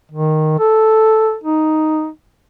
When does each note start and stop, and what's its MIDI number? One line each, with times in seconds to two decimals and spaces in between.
0.11 0.58 51
0.59 1.36 69
1.43 2.08 63